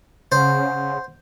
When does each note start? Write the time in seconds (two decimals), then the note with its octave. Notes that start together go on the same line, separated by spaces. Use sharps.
0.32 C#3 C5 F#5 C6